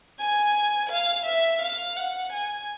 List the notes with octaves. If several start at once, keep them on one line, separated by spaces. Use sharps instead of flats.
G#5
F5
E5
F5
F#5
G#5